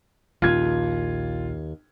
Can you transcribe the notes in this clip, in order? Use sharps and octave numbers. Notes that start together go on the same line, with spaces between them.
A#1 D#2 C#4 F4 G#6